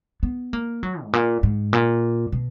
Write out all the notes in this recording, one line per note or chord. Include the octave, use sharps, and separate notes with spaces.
B3
A#3
F#3
G#2
A#2
G#2
A#2
B2